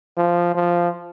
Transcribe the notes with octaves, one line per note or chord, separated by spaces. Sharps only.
F3
F3